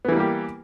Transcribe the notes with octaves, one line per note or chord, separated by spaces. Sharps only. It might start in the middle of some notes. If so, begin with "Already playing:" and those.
E3 G3 A#3 B3 G4